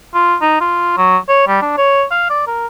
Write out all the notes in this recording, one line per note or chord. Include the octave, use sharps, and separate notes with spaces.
F4
D#4
F4
F#3
C#5
G3
D4
C#5
F5
D5
A#4